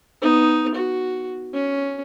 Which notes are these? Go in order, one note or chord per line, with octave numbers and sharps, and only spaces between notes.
B3 D#4
F#4
C#4